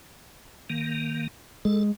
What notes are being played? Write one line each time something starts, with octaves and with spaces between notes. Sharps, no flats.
D#3 A#3
G#3 A4